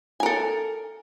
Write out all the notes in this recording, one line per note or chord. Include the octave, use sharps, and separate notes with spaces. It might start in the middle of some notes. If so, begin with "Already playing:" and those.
A4 A#4 G#5